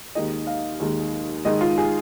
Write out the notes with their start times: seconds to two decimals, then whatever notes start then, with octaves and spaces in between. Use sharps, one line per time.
0.15 D#2 D#3 G#3 D#5
0.47 F5
0.80 D#2 D#3 G#3
1.45 G#2 D#3 G#3 D#5
1.61 F4
1.78 G#4